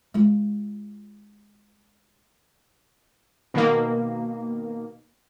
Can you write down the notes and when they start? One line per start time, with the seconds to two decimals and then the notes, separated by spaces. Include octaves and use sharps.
0.14 G#3 F4
3.54 B2 D#3 A#3